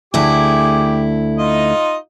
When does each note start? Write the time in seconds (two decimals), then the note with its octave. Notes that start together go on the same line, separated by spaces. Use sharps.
0.14 D2 E4 G4 G#4 D6
1.38 D#4 F4 D#5